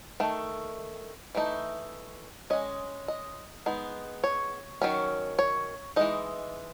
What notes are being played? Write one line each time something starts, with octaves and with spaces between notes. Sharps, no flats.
D#3 A3
E3 A3 D#4
G#3 C#4 D#5
D#5
G#3 B3 D#4
C#5
D#3 F#3 C#4
C#5
E3 G#3 D#4 D#5